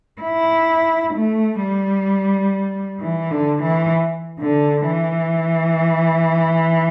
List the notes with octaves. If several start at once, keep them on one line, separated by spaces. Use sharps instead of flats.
E4
A3
G3
E3
D3
E3
D3
E3